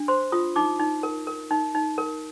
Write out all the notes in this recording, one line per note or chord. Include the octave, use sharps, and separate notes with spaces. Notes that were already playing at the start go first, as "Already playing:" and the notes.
Already playing: D4
C5 C6
F4 D#6
D#4 D6
D#4
A#4
A#4
D#4
D#4
A#4